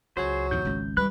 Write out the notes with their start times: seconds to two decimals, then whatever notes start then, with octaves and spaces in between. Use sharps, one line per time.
0.17 C#2 F#3 G#4 C5
0.51 E2 G#2 C3 G6
0.65 G#1 C#2 C#4
0.97 E3 G3 B4 F#6